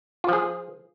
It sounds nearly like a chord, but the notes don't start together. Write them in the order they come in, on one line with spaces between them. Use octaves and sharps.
F4 F3 G#4